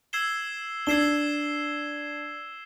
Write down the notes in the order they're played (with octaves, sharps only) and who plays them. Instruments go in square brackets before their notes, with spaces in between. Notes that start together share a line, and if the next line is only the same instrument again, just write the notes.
[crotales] E6 G#6 C7 E7 G7
[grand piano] D4 [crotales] E6 G#6 C7 E7 G7